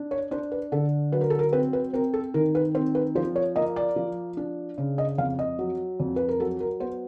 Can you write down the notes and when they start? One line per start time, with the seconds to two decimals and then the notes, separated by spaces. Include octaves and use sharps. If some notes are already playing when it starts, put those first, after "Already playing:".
Already playing: D4
0.11 C#5
0.31 D4 C5
0.52 B4
0.72 D3 A4
1.12 F#3 B4
1.21 A#4
1.30 A4
1.39 A#4
1.53 C4 B4
1.73 B4
1.94 C4 A#4
2.14 A4
2.34 D#3 A#4
2.55 B4
2.75 C4 C5
2.95 B4
3.15 F3 C5
3.36 C#5
3.56 A#3 D#5
3.76 D5
3.96 F3
4.37 D4
4.78 C#3
4.98 D#5
5.18 F2 F5
5.39 D#5
5.59 F#3
6.00 F2
6.16 B4
6.29 A#4
6.40 F#3 A4
6.60 A#4
6.80 B3 C5